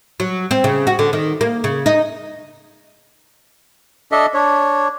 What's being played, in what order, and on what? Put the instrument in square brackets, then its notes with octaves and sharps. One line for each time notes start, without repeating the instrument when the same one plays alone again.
[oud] F#3
C4
C#3
F#4
D3
D#3
A#3
C#3
D#4
[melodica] D4 A4 D#5 E5
D4 C#5